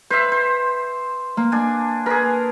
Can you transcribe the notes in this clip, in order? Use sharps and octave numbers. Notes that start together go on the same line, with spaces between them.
B4 C5 E5
C5
A#3
D4 G#5
G#4 A#4 B4